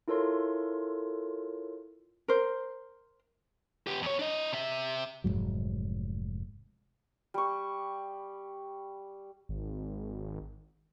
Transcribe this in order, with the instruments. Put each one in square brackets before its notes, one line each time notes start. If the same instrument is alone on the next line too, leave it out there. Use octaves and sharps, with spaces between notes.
[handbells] E4 F4 A4 A#4 C#5 C6
[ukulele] A#4 C5
[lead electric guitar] B3 G4
E2 C#5
D4 D#5
C3 E5
[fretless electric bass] F1 F2 G#2 F#3
[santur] G3 C#6
[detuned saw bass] G#1